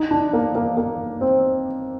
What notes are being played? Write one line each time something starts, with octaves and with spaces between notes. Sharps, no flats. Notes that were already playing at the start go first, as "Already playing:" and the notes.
Already playing: D#4
D4
A#3
A#3
A#3
C4